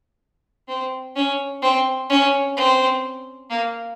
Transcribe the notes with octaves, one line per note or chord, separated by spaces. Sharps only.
C4
C#4
C4
C#4
C4
A#3